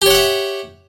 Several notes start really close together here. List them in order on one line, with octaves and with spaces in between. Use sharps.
G4 C#5 F#5 E5